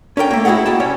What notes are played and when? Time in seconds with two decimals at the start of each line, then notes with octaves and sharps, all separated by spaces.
0.17 C#4 D4 A#4 G5
0.31 A3 A#3
0.45 E4 F#4 G#4 D#5 F#5
0.66 A#3 G5 A5
0.80 C2 G3 C#4 C#5